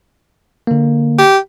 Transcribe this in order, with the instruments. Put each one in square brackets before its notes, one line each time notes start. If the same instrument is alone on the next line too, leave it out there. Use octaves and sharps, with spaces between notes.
[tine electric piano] D3 A#3
[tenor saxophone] G4